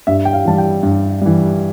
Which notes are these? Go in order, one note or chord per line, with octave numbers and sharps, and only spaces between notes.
G2 E5
G5
F5
E3 G3 A5
G5
G2
E3 G3